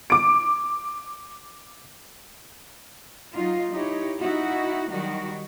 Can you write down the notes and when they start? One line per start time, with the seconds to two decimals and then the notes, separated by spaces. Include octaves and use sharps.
0.10 D6 D7
3.34 F#3 D#4 F4
3.72 D#4 E4 G4 C#5
4.19 D#4 E4 F#4
4.89 D#3 F#3 G3 F#4